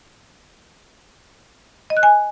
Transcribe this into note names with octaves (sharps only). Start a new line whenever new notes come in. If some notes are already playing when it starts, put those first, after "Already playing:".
D#5
F#6
G#5